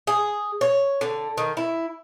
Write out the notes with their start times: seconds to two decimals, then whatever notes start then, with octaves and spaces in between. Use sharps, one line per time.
0.07 G#4
0.61 C#5
1.01 D3
1.37 D#3
1.57 E4